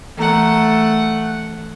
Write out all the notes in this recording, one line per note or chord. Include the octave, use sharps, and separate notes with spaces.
E3 A3 F#5 A#5